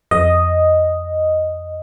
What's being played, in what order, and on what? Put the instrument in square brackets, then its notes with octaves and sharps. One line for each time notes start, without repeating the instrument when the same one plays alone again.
[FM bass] F2 [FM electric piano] D#5